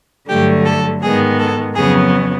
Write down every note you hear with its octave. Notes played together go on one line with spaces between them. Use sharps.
G2 D3 F#3 A3 G4
A4
G#2 D#3 G#3 B3 G#4
A4
F2 C#3 F#3 B3 G#4